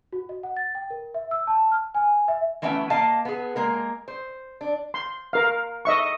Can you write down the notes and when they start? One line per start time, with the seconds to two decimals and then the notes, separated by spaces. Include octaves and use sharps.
0.13 F#4
0.29 D#5
0.43 F#5
0.57 A6
0.75 G5
0.90 A#4
1.14 E5
1.31 E6
1.47 A5
1.72 F6
1.95 G#5
2.28 E5
2.62 E3 A3 B3 C#4 E5 G5
2.90 A#3 D#5 F5 A5
3.25 B3 G#4
3.56 G#3 A#3 A#4
4.08 C5
4.61 D4
4.94 C6
5.33 A#4 F5
5.85 D#5 E5 C#6